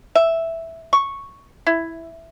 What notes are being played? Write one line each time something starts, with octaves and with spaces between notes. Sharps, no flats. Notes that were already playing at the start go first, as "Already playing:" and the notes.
E5
C#6
E4